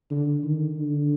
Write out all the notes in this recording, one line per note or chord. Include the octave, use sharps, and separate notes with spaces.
D3
D#3
D3